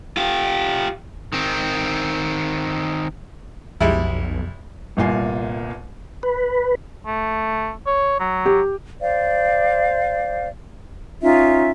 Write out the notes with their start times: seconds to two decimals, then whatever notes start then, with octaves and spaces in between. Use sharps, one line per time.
0.17 F4 G4
1.33 D#3 C4
3.80 B1 F2 G3 G#3 E4
4.97 G1 C2 A#2 F4 G#5 C7
6.23 B4
7.06 A3
7.86 C#5
8.20 F#3
8.46 G4
9.01 C5 D5 F5
11.22 C#4 D#4 F4 E5